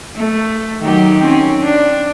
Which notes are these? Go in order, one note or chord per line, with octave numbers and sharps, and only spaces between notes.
A3
D#3 F#3 G4
C4 C#4
D4